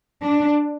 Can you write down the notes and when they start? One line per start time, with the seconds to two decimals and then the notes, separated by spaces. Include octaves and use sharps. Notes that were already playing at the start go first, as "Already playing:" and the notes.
0.22 D4